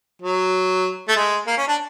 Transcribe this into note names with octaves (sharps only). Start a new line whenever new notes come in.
F#3
A3
G#3
A#3
C#4
D4